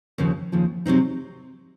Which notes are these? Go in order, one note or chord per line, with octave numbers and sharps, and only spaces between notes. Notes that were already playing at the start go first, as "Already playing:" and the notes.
D#2 C#3 F3
D#2 C#3 F3
C3 F#3 C4 D#4